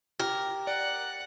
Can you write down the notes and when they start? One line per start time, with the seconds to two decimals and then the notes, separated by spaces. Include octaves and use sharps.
0.19 G4 A#4
0.67 D5 F#5